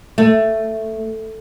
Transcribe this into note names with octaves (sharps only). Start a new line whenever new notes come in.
A3